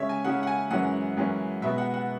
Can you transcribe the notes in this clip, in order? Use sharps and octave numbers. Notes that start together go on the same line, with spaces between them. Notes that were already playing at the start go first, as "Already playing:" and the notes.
Already playing: C#3 G#3 C#4 C#5 E5
G#5
C#3 G#3 C#4 F#5
F#5
G#5
F#2 E3 G#3 C#4 F#5
F#2 E3 G#3 C#4
B2 G#3 B3 E5
F#5
F#5